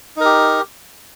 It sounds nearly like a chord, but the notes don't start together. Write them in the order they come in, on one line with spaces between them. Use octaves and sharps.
D#4 A#4 G4